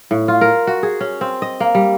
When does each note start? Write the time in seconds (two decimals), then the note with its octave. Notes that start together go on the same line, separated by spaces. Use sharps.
0.11 A2
0.28 F4
0.41 A#4
0.67 F#4
0.83 G#4
1.01 C#4
1.21 C4
1.42 D#5
1.60 A#3
1.75 G3